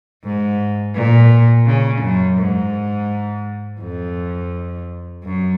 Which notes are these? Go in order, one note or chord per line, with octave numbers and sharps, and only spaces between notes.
G#2
A#2
C#3
F#2
G#2
F2
F#2